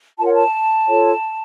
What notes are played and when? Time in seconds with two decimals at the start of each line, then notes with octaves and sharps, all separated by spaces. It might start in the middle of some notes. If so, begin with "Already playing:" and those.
0.18 F4 A5
0.21 A#4 C#5 F#5
0.33 A5
0.87 F4 A4 C#5